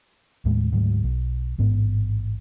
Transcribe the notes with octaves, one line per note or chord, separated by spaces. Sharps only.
D#2 A2 G#3
D2 G#2 F#3
B1
A1 G#2 B3